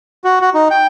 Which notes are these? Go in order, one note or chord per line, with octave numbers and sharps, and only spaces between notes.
F#4
F#4
D#4
G5